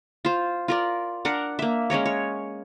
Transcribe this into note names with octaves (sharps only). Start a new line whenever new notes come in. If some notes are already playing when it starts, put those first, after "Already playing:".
F4 C5
F4 A#4 D5
D4 A#4 F#5
A#3 E5
G#3 C#4 A#4 C#5
C#5